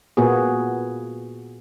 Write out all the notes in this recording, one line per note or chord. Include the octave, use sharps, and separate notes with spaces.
A#2 A#3 B3 F#4 G#4